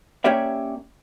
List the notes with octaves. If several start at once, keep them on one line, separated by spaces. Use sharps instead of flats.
A#3 C#4 G4 C#5 D5 E5